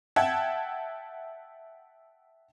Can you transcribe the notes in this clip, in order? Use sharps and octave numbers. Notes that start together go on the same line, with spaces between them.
E5 F#5 G5 A5 G#6